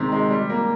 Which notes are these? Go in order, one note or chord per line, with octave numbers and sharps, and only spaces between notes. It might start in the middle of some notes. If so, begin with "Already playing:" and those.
Already playing: C3 D#3 G#3 C4
G#3
G3
A#3